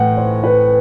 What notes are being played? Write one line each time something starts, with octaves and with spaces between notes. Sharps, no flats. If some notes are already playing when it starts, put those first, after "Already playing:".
Already playing: A2 E3 F#5 G5
C5
B4